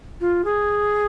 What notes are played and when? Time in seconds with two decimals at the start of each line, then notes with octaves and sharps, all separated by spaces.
0.21 F4
0.45 G#4